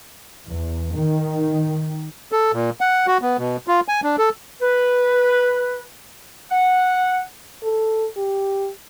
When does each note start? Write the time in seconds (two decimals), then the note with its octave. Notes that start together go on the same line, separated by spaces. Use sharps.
0.46 E2
0.94 D#3
2.32 A4
2.53 A#2
2.81 F#5
3.07 F#4
3.22 B3
3.38 B2
3.68 F4
3.88 G#5
4.04 D4
4.18 A4
4.61 B4
6.50 F#5
7.63 A4
8.17 G4